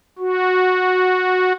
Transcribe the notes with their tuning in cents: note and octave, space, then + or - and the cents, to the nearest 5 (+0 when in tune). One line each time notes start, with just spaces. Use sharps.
F#4 -10